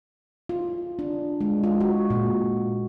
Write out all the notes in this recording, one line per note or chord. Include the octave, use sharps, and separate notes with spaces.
F4
D4
G#3
F4
F#4
A#2